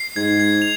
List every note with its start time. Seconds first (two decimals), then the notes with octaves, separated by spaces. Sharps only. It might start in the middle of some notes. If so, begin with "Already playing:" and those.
Already playing: C7
0.16 G#2 G#6
0.40 G#6
0.62 F7